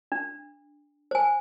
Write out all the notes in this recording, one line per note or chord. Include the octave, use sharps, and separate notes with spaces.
D4
C5 G#5